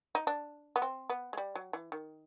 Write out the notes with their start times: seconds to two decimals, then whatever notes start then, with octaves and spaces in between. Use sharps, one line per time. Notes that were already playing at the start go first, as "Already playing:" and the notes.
0.15 D#4
0.27 D4
0.76 B3
0.82 C4
1.10 B3
1.33 G#3
1.37 G3
1.55 F#3
1.73 E3
1.92 D#3